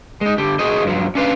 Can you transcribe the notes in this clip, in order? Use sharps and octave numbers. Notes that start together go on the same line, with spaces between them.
G#3 D#4
D3 G4
F#4 G#4 C5 D#5
G2 F3 F#3
C#4 D4 F4 B4 C5 F5